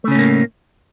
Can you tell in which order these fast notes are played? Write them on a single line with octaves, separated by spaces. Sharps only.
A3 C#3 C#4 A2 A#3